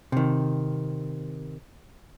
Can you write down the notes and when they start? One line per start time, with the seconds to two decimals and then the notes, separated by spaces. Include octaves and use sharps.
0.12 C3 D#3